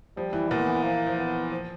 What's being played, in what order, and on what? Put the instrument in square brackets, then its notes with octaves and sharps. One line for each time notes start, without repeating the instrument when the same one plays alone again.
[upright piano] F3 [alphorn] G3
[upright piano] E3
[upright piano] A#2 [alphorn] B3
[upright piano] E3
[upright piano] F3 [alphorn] A#3
[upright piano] F3
[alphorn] B3
[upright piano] F3